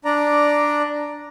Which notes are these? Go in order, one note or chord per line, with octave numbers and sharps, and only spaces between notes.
D4 D5 A#5